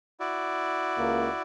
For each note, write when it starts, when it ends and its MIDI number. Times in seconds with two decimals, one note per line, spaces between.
0.20 1.42 64
0.20 1.42 66
0.20 1.42 74
0.97 1.27 37
0.97 1.27 58